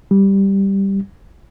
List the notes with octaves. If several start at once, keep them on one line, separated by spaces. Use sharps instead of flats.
G3